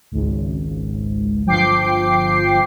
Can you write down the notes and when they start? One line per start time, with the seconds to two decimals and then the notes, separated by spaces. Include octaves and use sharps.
0.12 G#1 C#2
1.46 G1 F3 G5 D6 C7